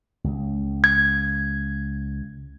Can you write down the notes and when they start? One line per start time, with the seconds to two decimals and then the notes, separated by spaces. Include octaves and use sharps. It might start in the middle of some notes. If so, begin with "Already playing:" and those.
0.24 C#2
0.84 G#6